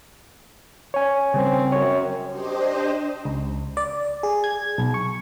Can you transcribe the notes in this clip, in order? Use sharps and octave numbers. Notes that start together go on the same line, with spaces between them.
C#5 G#5
C#3 G3 C4
F#2 C#5
D4 G4 C5 D#5
C#2
D5
G#4
G#6
B1
C#6